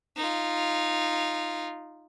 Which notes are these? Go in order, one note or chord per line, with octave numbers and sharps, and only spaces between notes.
D#4 F4